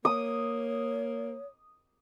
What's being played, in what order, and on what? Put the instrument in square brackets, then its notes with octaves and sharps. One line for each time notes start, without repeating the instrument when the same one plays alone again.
[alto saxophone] A#3 [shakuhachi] C#5 [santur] D#6